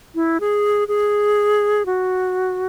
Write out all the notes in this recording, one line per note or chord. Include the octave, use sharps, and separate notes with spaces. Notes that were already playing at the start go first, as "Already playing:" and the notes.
E4
G#4
G#4
F#4